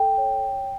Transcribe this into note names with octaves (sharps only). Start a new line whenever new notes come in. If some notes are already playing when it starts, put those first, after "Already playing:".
Already playing: A4 G5
C#5